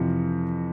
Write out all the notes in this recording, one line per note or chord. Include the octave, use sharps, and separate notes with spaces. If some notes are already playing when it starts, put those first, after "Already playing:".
Already playing: F2 C3 E3 F4